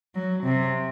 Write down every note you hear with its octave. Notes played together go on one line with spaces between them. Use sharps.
F#3
C3